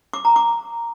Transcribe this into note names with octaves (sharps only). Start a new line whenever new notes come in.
D6
A#5
D6